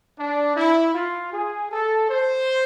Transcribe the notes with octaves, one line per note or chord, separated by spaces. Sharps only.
D4
E4
F4
G#4
A4
C5